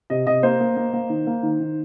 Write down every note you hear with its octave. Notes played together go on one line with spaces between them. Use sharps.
C3 D#5
C3 D#5
A#3 C5
A#3
A#3
A#3
D#3
A#3
D#3
D#3